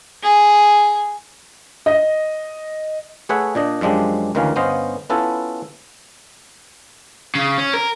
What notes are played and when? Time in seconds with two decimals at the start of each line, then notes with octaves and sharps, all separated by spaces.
0.23 G#4
1.86 D#5
3.29 A3 G#4 B4 C#5 E5 F#5
3.55 A#2 D4 D#5
3.81 F#2 F3 G#3 D4 G4
4.35 D2 D#3 E3 A#3 C#4 F5
4.56 G1 B3 C#4 C5 D#5 F5
5.10 B3 C#4 E4 F4 A4 B4
7.35 C#3
7.58 C#4
7.74 A#4